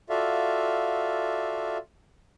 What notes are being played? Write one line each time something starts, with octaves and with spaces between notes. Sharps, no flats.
F4 F#4 A4 D5 E5 F5